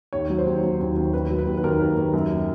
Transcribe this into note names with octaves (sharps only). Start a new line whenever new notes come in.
D#2 C#5
F#3
C5
D#2
F#3
D#2
D#2
D#2 B4
F#3
B4
D#2
B4
D#2 A#4
D#2
D#2
F#2